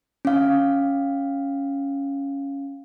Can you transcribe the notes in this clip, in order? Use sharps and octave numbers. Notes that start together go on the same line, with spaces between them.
C#4 F5